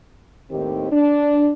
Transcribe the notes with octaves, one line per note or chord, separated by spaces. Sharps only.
D#2 A2 D#3 C4 G4
D4